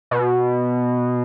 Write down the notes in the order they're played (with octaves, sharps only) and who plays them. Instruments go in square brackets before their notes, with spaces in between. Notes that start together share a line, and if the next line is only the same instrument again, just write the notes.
[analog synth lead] B2